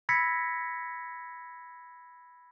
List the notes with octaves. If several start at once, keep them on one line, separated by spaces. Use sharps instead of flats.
B5 E6 G#6 A#6 B6 C#7